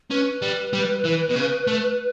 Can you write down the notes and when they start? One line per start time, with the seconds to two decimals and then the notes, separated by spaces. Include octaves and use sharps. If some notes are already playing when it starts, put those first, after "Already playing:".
0.11 C#4 B4
0.42 G3
0.73 G3
1.05 E3
1.30 B2
1.36 C#3
1.67 A3